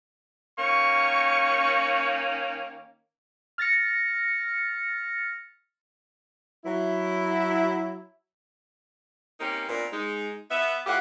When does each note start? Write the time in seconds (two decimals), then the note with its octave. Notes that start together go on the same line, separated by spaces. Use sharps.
0.58 D#3 A#3 C#4 C#6
3.58 F6 A6 A#6 C#7
6.65 F#3 E4
9.40 A#3 C4 C#4 D#4 G4 A#4
9.68 A#2 B3 C4 D4 A#4
9.91 G#3 D#4
10.51 B3 E5
10.86 A2 F4 G4 E5 F#5